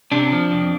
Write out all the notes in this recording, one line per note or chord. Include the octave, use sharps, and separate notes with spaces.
C3 D4
F3
F2